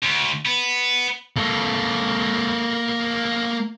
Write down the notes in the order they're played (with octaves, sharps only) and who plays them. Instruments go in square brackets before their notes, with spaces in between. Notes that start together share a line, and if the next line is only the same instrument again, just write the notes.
[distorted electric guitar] D2
B3
A#3 A4